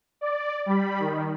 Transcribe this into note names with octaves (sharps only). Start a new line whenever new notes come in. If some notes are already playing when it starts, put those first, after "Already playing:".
D5
G3 B5
D#3